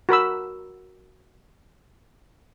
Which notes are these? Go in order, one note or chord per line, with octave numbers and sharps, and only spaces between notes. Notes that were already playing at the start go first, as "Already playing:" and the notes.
F#4 A#4 B5 E6